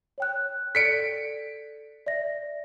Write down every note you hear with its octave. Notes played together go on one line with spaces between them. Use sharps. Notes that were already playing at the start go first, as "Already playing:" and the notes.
C#5 G5 F#6
A4 D5 B6 C#7 D7
D5 E5 A#6